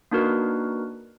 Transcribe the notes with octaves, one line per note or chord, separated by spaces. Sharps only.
A#3 D4 D#4 F#4 A#4 B4